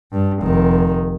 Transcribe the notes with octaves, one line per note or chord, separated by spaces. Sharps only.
G2
F1 D#3